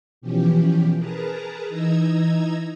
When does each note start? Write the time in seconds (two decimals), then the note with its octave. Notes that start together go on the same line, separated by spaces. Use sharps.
0.21 B2 E3 F3 C#4 G4
0.95 G#4 A#4 B4 A5 A#5
1.69 E3 D#4 D#5 A#5 E6 G#6